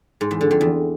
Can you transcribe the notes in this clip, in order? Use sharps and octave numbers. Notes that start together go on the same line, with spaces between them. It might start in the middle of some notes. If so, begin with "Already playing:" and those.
G#2
E2
D3
F2
E2